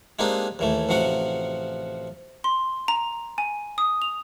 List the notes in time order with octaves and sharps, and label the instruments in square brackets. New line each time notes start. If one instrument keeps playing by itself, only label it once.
[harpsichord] G#3 A#3 C4 D4 D#4 G4
D#2 E3 A3
A1 C3 F3 F#4 F#5
[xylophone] C6
A#5
G#5
D#6
F7